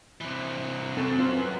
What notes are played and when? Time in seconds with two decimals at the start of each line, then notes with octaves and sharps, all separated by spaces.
0.21 C3 E3
0.97 F#2 C4 A4
1.19 C4 F4 C5
1.36 B4